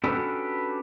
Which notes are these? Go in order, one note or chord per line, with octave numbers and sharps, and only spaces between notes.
C#4 D4 F#4 G4 A4 B4